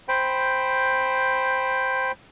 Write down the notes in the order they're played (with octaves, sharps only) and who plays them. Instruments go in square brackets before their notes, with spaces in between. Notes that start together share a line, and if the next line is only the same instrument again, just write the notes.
[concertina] C5 G5 B5